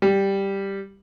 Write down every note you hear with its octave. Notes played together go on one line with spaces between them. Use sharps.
G3